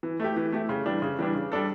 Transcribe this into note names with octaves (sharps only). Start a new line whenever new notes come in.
E3
A3 E4 G4
E3
A3 E4 G4
C#3
E3 G3 D4
C#3
E3 G3 D4
C#3
G3 D4 A4